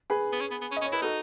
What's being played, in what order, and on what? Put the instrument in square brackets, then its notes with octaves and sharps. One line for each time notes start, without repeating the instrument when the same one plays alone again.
[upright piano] G#4 B4
[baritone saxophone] B3
C#4
B3
B3
C#4
[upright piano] D#5
[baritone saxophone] C#4
[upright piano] C#5
[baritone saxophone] E4 [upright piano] B4
[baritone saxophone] D#4 [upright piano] F#4 A4